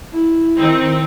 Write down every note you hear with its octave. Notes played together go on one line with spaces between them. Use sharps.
E4
D#3 C4 D#4